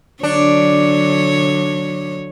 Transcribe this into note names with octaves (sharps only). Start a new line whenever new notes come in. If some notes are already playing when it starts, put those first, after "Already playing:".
D3 F#3 D4 C#5